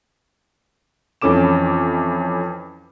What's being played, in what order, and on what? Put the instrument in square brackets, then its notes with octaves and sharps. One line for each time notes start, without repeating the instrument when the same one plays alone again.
[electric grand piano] F2 E3 C#4 A4 D6 E7